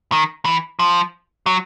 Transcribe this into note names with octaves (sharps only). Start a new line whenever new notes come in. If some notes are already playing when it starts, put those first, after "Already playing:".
D#3
E3
F3
F#3